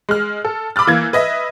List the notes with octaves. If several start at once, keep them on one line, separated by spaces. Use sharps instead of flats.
G#3 F6
A4
B5 D6 E6 F6 A6
E3 A#3 G#6
B4 D#5 E5